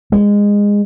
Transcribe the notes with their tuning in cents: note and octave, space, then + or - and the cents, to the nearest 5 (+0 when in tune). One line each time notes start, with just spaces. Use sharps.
G#3 -20